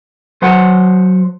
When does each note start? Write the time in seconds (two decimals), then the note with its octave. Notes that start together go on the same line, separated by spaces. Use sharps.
0.42 F#3 C5 F#5